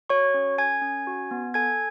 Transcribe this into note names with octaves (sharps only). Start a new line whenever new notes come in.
F#4 C#5 C#6
C#4
A4 G#5 G#6
C#4
F#4
B3
A4 G#5 G#6